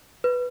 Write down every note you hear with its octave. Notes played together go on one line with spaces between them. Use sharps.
B4